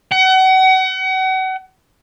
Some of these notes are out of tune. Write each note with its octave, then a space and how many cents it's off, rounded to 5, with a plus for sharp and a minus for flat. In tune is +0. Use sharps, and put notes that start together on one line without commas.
F#5 +35